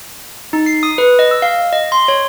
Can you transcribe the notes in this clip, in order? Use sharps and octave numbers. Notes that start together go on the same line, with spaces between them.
D#4
C7
D#6
B4
D#5
E6
F5
D#5
C6
C#5